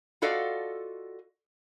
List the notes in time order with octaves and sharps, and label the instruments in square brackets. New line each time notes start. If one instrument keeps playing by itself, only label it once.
[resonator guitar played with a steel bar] F4 F#4 A4 D5 D#5 F5